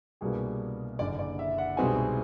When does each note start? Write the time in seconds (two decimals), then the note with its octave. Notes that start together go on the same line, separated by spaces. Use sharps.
0.21 C2 B2 G3 A#3 D4 G#4
0.99 F#1 F#2 D3 D5
1.19 D5
1.39 E5
1.58 F#5
1.77 C2 B2 G#3 C4 D#4 G#5